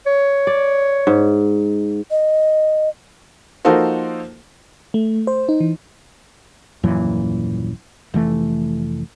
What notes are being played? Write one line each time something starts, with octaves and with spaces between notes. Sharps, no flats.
C#5
D5
G#2
D#5
F3 A#3 D#4 F#4 A4 C5
A3
C5
D#4
E3
D#1 F#2 A#2 E3
F1 E3 A3